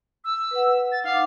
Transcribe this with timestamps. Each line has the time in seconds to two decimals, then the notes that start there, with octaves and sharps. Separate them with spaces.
0.24 E6
0.51 B4 F#5
0.92 A6
1.04 D#4 F5 F#5 D6